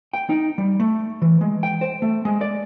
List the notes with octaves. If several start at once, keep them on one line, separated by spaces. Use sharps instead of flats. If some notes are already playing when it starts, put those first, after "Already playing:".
G5
D#4
G3
A3
E3
G#3
G5
C5
A3
G#3
D5